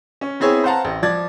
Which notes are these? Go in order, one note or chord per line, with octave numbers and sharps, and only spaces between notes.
C#4
B3 C4 E4 G#4 C#5
C5 F5 F#5 A5 A#5
A1
F3 D5 G#6 A6